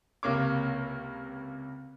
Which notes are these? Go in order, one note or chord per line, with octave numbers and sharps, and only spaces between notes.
C#2 C3 A#3 C#5 D6